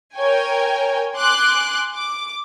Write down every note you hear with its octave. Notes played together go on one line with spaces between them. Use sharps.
A#4 C#5 G5 G#5
G#5 C6 D6 F#6
D6